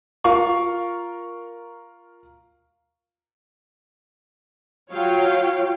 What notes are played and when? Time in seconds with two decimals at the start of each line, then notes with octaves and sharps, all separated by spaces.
0.24 F4 A#4 F5 C#6
4.90 F#3 F4 C#5 F5 G5